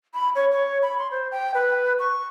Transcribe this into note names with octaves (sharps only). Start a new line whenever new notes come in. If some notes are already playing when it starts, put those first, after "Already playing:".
B5
C#5
C#5
B5
C6
C5
G5
B4
C#6